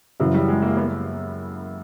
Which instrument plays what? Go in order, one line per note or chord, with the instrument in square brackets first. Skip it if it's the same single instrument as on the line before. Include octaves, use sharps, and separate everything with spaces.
[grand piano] F#2 C#3 E3 [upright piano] F#3
[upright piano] G3
G#3
A#3
B3